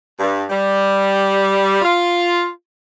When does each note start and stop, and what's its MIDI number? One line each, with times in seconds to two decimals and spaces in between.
0.19 0.43 43
0.50 1.80 55
1.82 2.47 65